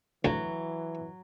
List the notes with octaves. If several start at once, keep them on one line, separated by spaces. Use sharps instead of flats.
D2 E3 F#3